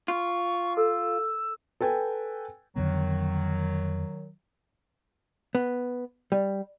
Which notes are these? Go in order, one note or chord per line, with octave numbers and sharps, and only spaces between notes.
F4 C#6
A4 E6
A4 B4 G5 G#5
F2 D3 D#3 F#3 B3
B3
G3